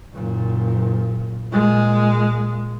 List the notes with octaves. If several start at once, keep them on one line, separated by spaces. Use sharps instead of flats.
F#1 A#2
A#2 G#3